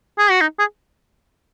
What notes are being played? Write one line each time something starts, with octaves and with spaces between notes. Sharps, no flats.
G#4
F#4
D#4
G#4